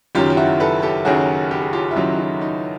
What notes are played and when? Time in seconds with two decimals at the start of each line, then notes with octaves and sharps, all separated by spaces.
0.15 F#1 F#2 D#3 F#3 F4 G4
0.30 G4
0.37 E4 F#4
0.60 A4 B4
0.82 G4 A4
1.05 F#1 F#2 D#3 F#3 F#4 G#4
1.51 G4
1.62 G#4
1.73 F4 G4
1.91 E4
1.96 F#1 F#2 D#3 F#3 D#4 F4
2.14 D#4
2.19 E4
2.41 D#4